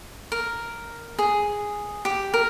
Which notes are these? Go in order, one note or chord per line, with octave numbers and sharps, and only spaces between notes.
A#4
G#4
G4
A#4